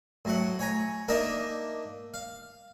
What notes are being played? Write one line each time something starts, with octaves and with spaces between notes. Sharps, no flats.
A2 F#3 F#5
C#5 G#5 A#5
A#3 D4 D#4 A#4 D#5 E5
F5